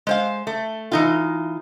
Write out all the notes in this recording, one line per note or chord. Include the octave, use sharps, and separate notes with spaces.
G#3 C5 F5
A3
E3 D#4 F4